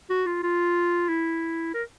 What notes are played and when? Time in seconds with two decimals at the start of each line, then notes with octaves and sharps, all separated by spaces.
0.10 F#4
0.26 F4
0.43 F4
1.08 E4
1.74 A#4